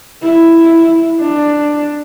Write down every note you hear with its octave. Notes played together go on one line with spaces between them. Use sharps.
E4
D4